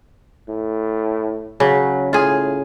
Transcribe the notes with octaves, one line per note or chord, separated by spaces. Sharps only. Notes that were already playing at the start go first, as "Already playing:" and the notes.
A2
C#3 F#3
A2 F4 G#4